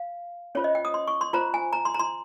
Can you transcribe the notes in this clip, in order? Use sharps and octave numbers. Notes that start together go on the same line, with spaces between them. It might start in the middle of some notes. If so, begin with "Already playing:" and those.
Already playing: F5
C#4 F4 C5 C#5
D#5
G5
D#6
C6
C#6
C6
F4 C5 A#5
G#5
A#5
C6
A#5
C6